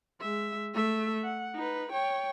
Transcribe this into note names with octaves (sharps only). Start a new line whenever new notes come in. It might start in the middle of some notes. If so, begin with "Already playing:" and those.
G#3 E5
A3 E5
F#5
D#4 B4
C#5 G5